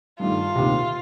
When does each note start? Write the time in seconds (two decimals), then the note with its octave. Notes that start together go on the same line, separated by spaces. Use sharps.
0.20 G2 D#3 A3 F4
0.55 D2 C3 D#3 A#3